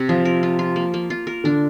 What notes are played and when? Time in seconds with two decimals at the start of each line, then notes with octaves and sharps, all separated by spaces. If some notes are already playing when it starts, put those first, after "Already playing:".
Already playing: C3
0.09 F3 F4
0.25 A#4
0.43 F4
0.59 F4
0.76 A#3
0.94 A#3
1.10 F4
1.27 A#4
1.44 D3 D4